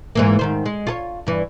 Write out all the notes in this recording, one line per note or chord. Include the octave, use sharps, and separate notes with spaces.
G#2 E3 A#3
G#2 D#3 C5
G#3
F4 G#4 C#5
G2 E3